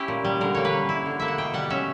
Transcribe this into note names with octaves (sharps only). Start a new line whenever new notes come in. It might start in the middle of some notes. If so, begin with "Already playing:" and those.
Already playing: C#4 E4 G4
A#2
G3
D3 A#4
A#3 C#5
B4
C#4
E4
D3
A#3 E5
F#5
B2 G5
G3 F#5
C#4 E5